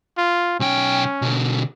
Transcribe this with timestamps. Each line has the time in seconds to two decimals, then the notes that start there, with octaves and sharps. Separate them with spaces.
0.18 F4
0.60 B1 C#4 G5
1.22 B2 D3